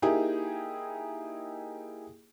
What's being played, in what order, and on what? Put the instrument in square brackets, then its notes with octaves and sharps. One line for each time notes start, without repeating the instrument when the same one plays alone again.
[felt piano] A#3 D#4 E4 G4 G#4